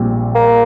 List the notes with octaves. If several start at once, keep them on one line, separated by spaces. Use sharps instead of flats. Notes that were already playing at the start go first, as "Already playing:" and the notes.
Already playing: A#1 A#2 G3 C4
A#3